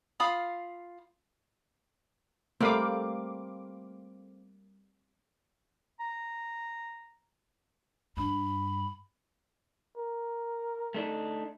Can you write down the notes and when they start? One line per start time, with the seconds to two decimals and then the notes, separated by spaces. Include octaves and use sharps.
0.20 F4 F5 B5 D#6
2.60 G3 A3 A#3 C4 F5 D6
6.00 A#5
8.17 G2 D4 B5
9.97 A#4
10.94 A3 D4 D#4